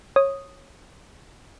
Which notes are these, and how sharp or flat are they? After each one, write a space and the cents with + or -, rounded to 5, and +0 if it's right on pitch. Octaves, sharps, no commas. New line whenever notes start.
C#5 -15 D#6 +0